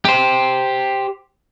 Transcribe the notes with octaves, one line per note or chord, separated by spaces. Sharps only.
G4 C5